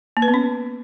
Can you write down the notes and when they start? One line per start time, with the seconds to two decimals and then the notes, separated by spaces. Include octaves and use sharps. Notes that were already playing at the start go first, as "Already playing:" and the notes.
0.17 A#3
0.22 B4
0.28 B3
0.34 C#4